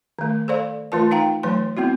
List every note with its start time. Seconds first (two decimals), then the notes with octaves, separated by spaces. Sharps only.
0.19 D#3 A3
0.48 A4 C5 D5 F5
0.92 E3 A3 F4 A#4 A5
1.11 D#4 F5 G5 A#5
1.43 E3 F#3 A3 C6
1.77 B3 C4 E4 F#4